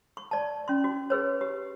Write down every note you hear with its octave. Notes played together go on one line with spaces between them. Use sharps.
C#6
D5 A5
C#4 C6
F#4
G#4 B4 C#5
G4